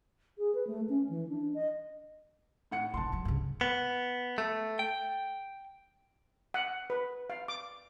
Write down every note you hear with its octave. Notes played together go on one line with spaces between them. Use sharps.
G#4
B4
A3
C#4
E3
D4
D#5
A2 F#5 C#7
D3 D#3 A5 C6
D2 F#3
G2 C#3
B3
A3
G5
F#5
B4
F5
D6